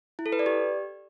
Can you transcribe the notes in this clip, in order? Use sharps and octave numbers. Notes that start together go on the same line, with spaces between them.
E4
A4
B4
D5
G4